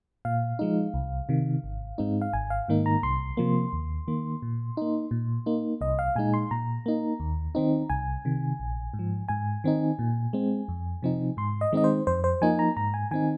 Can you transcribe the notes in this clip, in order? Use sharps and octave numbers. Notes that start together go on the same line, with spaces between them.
A#2 F5
F3 G#3 D#4
C2
C3 D#3
G#1
G#2 G#3 C4 D#4
F5
G#1 G#5
F5
G#2 D#3 A#3 D#4
A#5
C2 C6
C3 F3 A#3
D#2
D#3 A#3
A#2
A#3 D#4
A#2
A#3 D#4
C2 D#5
F5
A#2 G#3 D#4 G#5
C6
A#2 A#5
A#3 D#4
D#2
D#3 C4 D#4
C2 G#5
C3 D#3
A#1
G#2
F3
G#2 G#5
D#3 C4 D#4
A#2
G#3 C4
F2
C3 F3 C4 D#4
G#2 C6
D#5
D#3 G#3 C4 D#4 D#5
C5
F2 C5
C5
F3 A#3 D#4 G#5
A#5
G#2 A#5
G#5
D#3 C4 D#4 G#5